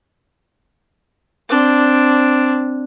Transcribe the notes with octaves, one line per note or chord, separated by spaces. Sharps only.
C4 D4